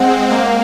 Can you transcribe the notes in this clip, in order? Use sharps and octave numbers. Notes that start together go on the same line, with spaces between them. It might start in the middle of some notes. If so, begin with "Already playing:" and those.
Already playing: G#3 C4 F#5
A#3 F5